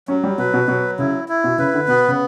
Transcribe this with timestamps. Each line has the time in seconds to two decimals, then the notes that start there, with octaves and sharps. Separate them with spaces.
0.08 F#3 C#4
0.24 G3
0.38 B2 B4
0.54 B2
0.68 B2 F#3
0.99 C#3 E4
1.28 E4
1.44 B2
1.58 C#3 B4
1.74 D3
1.88 B2 B3
2.08 C#3